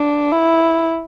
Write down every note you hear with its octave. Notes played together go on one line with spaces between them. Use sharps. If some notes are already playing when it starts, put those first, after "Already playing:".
Already playing: D4
E4